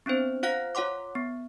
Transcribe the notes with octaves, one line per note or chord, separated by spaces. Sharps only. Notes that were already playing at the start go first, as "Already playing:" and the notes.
B3 C4 D4 C5
F4 C5 F5 F#5 F#6 A#6
F4 C#5 F#5 C6 D6
B3